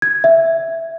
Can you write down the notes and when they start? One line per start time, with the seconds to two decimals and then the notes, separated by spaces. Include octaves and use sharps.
0.02 G#6
0.24 E5